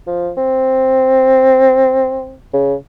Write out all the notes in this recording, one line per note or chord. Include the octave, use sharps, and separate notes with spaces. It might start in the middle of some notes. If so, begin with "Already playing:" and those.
F3
C4
C#3